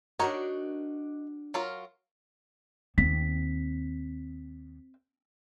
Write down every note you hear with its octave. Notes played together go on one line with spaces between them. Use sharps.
D4 D#4 F#4 A#4 C#5
F#3 F4 A#4
D#2 C4 B6